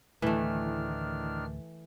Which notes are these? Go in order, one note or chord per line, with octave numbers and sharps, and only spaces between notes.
D2 A2 D#3 E3 A3 D4 F6